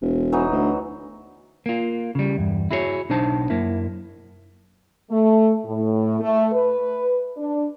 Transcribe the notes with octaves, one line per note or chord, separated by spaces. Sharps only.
E1
E3 F#3 D#4
D2
A#3 F4
C#3 G3
E2 G2
E4 F#4 G#4 A#4 C#5
B1 D4 D#4 C5 A5
F#2 A#3 E4
A3
A2
A3
B4
D4